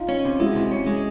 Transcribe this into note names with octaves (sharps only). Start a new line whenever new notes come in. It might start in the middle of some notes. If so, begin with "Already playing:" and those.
Already playing: D#4 F4
C#4
C3
G#3 E4 F#4
C3
C#4
G#3